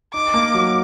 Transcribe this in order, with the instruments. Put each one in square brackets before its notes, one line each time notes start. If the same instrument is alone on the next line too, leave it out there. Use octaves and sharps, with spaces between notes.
[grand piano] D#4 [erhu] D6
[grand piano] A#3
F#3